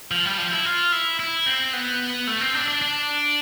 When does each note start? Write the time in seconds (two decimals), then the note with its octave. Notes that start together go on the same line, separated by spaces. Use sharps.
0.11 F3
0.25 G3
0.38 F3
0.51 E4
0.65 F4
0.92 E4
1.19 E4
1.46 C4
1.73 B3
2.27 A3
2.41 C4
2.55 D4
2.68 D4
2.82 D4